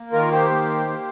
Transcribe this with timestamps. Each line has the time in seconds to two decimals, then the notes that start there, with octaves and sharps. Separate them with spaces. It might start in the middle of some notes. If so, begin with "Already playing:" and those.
Already playing: A#3
0.12 D#3 F4 A#4
0.32 G4 C5
0.50 A#3
0.88 A#3